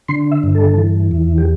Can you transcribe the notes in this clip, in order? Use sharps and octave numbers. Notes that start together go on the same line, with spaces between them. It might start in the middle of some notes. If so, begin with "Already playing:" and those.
D3 C6
E5
G2
A4
E3
E2
G4